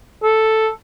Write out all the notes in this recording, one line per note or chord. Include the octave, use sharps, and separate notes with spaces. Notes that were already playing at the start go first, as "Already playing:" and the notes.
A4